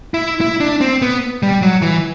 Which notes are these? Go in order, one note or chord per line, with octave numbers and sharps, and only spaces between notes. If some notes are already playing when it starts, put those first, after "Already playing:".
E4
E4
D4
C4
B3
G3
F#3
E3